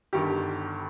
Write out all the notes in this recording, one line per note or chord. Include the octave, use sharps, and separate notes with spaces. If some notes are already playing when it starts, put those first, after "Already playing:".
G1 G2 D#3 G3 G4